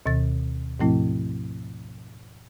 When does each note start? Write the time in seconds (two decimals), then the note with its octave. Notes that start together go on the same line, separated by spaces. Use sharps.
0.06 D2 B2 D#3 A6
0.80 G#2 B2 F3 A3 C4 E4